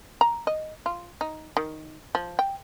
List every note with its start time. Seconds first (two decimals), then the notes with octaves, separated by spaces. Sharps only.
0.21 A#5
0.47 D#5
0.86 F4
1.21 D#4
1.57 D#3
2.15 F3
2.39 G5